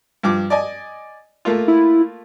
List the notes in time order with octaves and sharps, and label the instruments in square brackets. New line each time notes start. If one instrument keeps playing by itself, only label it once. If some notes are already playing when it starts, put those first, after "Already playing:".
[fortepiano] G2 F3 D6
D5 D#5 G#5
A3 A#3 F4
[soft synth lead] E4